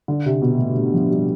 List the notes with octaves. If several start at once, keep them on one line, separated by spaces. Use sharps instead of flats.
D3
C3
B2
A2
A2
F3
G3